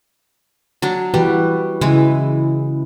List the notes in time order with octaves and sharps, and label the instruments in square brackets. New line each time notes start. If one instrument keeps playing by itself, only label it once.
[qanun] F#3 D4
[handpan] E3 F#4 B4 [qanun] G3
[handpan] C#3 E4 [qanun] E3 G#3